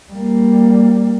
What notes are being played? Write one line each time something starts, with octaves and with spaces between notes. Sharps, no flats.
G3 A#3